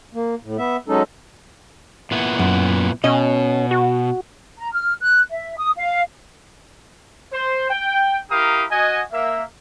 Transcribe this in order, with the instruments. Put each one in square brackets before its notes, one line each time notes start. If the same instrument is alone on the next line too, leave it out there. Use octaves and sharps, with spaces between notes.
[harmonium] A#3
A2
B3 E5
F#3 G#3 C#4 D#4 A4
[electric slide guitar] A#2 B3 E4
[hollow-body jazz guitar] F#2
[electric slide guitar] B2 [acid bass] C#4 [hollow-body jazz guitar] D#5
[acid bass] F#4
[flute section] A#5
F6
F#6
E5
D#6
F5
[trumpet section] C5
G5
E4 G4 A#4 F5 A#5 D#6
F#4 D#5 G#5
A#3 E5